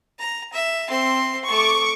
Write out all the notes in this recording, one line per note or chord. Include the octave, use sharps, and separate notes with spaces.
A#5
E5
C4 C6
A3 C#6 D6